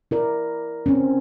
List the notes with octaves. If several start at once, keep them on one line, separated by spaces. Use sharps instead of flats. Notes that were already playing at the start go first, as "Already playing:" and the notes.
E4 A#4 D5
C4 C#4